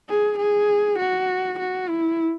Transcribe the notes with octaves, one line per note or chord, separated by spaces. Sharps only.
G#4
G#4
F#4
F#4
E4